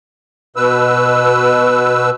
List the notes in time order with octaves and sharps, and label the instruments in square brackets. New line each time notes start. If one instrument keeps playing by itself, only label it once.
[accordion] B2 B4 E6